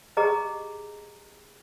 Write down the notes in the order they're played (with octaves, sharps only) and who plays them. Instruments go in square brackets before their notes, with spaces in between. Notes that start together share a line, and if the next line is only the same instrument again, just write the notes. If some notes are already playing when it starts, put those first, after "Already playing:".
[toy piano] G4 G#4 D#5 A#5